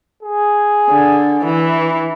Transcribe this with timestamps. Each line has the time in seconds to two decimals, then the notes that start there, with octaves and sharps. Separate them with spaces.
0.23 G#4
0.90 D3
1.45 E3